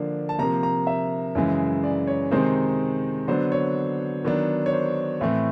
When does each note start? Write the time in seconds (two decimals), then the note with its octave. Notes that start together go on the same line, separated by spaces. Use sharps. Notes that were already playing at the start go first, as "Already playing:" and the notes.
Already playing: D3 F3 A#3 D4
0.29 A5
0.39 C3 F3 A#3 A#5
0.63 A#5
0.87 E5
1.35 F#2 C#3 E3 G#3
1.84 D5
2.07 C#5
2.31 C3 D#3 G#3 C4 D#4 C5
3.28 D3 F#3 B3 D4 C5
3.52 C#5
4.24 D#3 F#3 B3 D4
4.66 C#5
4.72 C5
5.21 A2 E3 A3 C4